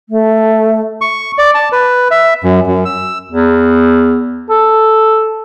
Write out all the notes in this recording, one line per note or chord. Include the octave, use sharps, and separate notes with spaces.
A3
C#6
D5
A5
B4
E5
F#2
F#2
E6
E2
A4